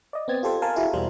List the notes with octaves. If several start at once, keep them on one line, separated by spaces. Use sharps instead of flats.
D5 D#5
B3 C4 G#6 A6
F4 G4 A4 C5
A#4 F5 G#5 A5
E4 F#4 G#4 F5
E2 B2 G3 C5